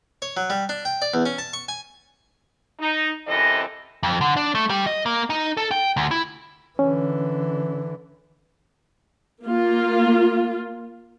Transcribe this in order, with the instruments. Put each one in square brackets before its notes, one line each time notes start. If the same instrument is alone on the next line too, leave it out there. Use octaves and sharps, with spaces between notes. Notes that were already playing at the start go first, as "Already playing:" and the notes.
[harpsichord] C#5
F#3
G3
D4
G5
D5
E2
C#4
A5
C#6
G#5
[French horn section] D#4
F#2 C3 E3 C4 A4 D#5
[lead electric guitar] F2
D3
D4
A3
G3
D#5
A#3
D#4
A4
G5
D2
E4
[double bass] D3 E3 [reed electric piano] C#4
[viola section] A#3 F4